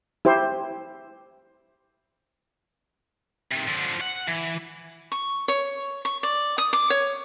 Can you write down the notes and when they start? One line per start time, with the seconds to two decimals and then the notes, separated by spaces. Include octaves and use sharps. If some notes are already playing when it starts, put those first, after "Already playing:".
0.25 E4 G4 C5
3.51 C3 D#3
3.68 D3 F3
4.01 F#5
4.28 E3
5.12 C#6
5.48 C#5
6.05 C#6
6.23 D5
6.58 D#6
6.73 D6
6.90 C#5